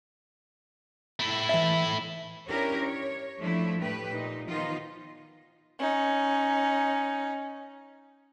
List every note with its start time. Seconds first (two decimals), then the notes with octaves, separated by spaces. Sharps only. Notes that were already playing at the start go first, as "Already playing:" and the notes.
1.19 A3 E4
1.49 E3 E5
2.47 C#4 D4 E4 G4 A#4 C#5
2.82 C#5
3.38 F3 A3 D4 E4
3.79 A2 A3 G4 B4
4.10 A#2 D#4
4.48 D#3 F3 B3 D#4 F4
5.79 C#4 D#4